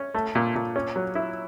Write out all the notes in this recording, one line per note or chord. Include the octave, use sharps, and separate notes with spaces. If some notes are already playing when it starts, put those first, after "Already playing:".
Already playing: C#4
A3
A#2
A#2
C#4
F#3
E4